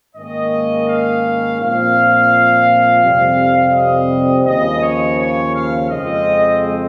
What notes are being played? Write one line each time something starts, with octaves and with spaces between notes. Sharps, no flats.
G#2 D#3 A#3 C#4 D#5
F5
A#2 F3 C4 F5
F2 C3 G3 C4
D#5
D#2 C#3 F3 D#5
C#5
C#5
F5
F2 C#3 G#3 C4 D#5